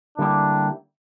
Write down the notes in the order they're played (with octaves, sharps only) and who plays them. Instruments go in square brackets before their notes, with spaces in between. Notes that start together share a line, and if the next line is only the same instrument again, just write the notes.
[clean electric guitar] D3 G3 A#3 E4 G4 [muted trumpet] D4